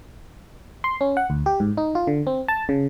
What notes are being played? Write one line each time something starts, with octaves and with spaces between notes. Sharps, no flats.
C6
C#4
F#5
D2
G4
G#2
D#4
F4
D3
C4
A5
C#3